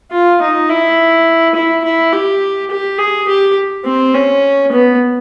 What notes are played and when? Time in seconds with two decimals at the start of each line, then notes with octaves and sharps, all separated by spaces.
0.11 F4
0.41 D#4
0.69 E4
1.55 E4
1.84 E4
2.13 G4
2.70 G4
2.99 G#4
3.28 G4
3.85 C4
4.14 C#4
4.72 B3